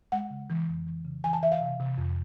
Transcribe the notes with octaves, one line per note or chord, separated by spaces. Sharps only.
G#3 F#5
C#3
E3
F2
E3
C#3
E3 G#5
A5
E3 E5
F5
C3
C3
F2